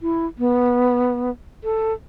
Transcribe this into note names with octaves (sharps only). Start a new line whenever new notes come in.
E4
B3
A4